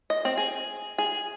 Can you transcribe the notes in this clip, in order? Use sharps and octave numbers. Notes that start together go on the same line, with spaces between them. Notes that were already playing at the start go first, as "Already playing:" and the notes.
D#5
C4
G#4
G#4